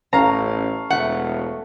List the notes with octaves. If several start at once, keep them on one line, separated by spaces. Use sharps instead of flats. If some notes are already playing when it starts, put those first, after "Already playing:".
A1 C#4 A4 F5 A#5
E1 A3 F#5